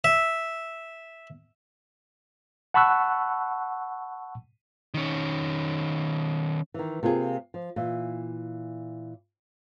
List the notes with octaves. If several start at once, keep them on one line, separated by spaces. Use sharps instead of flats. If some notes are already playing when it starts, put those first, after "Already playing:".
E5
F#5 A5 B5 C#6 E6 F#6
D#3 C#4
D#3 E3
C3 A#3 F4 F#4 G#4
F3
A#2 E3